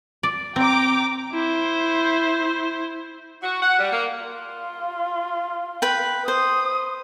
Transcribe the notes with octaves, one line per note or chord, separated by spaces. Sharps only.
D5
C4 G5 A#5 D6
E4 C5
F#4
F#5
G3
A#3
F4
B4 G5
C5 D#6